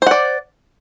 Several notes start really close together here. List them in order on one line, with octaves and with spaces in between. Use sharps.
C5 F#5 D5